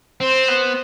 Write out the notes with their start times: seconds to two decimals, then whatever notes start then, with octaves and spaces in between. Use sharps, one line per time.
0.21 C4 C5
0.48 B3